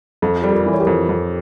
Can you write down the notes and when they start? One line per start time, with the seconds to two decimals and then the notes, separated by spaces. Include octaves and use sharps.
0.22 F2 F4 A4
0.42 G3 A4
0.51 G4 A#4
0.66 E3
0.73 C#5
0.80 G4 A#4
0.87 F2
1.09 F2